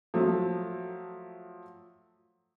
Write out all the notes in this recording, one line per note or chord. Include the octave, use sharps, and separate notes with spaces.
F3 F#3 A3